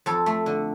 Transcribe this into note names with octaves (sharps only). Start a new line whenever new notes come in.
F2 A4
A3
D3